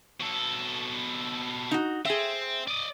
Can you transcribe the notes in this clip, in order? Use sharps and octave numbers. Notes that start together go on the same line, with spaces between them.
B2 A4
D#4 F#4
C4 G#4 E5
D5 D#5